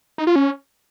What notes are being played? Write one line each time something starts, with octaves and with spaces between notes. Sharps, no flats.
D#4
F4
C#4